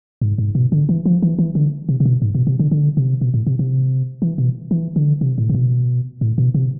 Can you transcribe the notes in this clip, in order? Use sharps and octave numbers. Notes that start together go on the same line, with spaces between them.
G#2
G#2
B2
D3
E3
F3
E3
E3
D3
C3
C3
B2
G#2
B2
C3
D3
D3
C3
B2
A2
C3
C3
E3
B2
E3
D3
C3
A2
C3
B2
A2
B2
C3